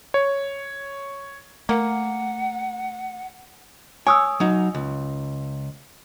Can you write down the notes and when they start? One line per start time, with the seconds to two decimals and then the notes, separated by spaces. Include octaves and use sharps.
0.14 C#5
1.69 A3 A#3 F#5
4.07 C#5 G#5 D#6 E6
4.40 F#3 D#4
4.75 C#2